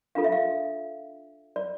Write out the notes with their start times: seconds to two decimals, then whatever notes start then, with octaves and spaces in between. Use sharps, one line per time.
0.15 D4 F4 A4 F5
0.24 E5
0.32 F5
1.56 D5